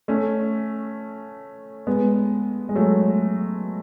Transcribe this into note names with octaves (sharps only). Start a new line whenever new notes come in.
A3 C#4
G#3 B3
G#3
F#3 A3